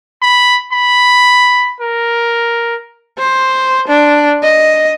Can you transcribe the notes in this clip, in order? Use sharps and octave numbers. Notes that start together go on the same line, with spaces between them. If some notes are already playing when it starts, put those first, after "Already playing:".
B5
B5
A#4
C5
D4
D#5